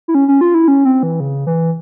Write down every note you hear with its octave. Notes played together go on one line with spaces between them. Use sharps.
E4
C#4
C#4
F4
E4
C#4
C4
E3
C#3
E3